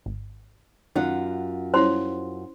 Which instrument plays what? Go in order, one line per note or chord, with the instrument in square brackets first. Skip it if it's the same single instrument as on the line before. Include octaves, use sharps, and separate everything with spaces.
[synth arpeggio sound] G#1
[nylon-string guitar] F#2 F4 F#5 [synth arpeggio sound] D#3 C#4 D#4
[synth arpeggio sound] G3 [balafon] C#4 E4 C#5 [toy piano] C5 C6